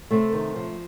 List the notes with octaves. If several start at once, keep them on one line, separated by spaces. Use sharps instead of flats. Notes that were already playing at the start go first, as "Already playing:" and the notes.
C3 A3
D#3
F3